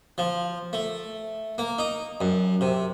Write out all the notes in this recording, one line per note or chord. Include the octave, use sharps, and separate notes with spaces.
F3
A3
A#3
D#4
F#2
C3